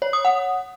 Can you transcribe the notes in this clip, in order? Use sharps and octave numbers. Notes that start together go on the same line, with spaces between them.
C#5
D#6
F#5